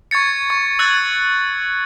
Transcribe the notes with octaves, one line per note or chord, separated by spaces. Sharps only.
C#6 G#6 A6 C#7
C#6
E6 F#6 G#6 A6